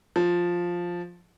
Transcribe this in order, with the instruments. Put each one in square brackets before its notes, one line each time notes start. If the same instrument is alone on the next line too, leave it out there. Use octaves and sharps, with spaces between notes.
[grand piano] F3